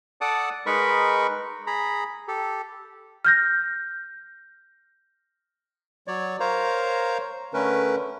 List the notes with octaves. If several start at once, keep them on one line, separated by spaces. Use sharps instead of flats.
A4 D5 F#5 A5 D6 D#6
G#3 D#4 A#4 B4 B5 C#6
G#4 A#5 B5
G4 A4
F6 G6 A#6
F#3 C#5 D5
A#4 C5 C#5 F5 A#5
D3 A3 C#4 A#4 B4